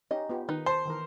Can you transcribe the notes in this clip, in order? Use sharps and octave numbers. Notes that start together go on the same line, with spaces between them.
C#4 D#4 G4 D#5
B3 F4 G4
D#3 D#4 B4
C5 A5
D#3 E3 A#4